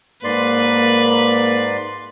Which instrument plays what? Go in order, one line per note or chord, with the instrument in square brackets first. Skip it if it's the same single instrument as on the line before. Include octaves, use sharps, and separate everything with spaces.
[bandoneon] G#2 D5 C6 [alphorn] A#3 [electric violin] B4